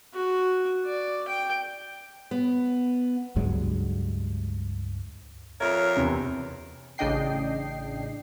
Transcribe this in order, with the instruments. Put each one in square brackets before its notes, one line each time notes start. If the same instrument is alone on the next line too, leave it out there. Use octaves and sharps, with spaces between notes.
[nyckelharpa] F#4
D5
G5
[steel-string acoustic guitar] B3
[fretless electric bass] C#2 G2 F#3 G#3
[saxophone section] F2 A#4 C#5 [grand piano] E5
[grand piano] E2 C3
[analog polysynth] A1 C#3 D4 D#5 G5 C7